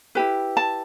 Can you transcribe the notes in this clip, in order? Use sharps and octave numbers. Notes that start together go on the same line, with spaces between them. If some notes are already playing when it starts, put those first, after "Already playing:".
E4 G4 B4
A5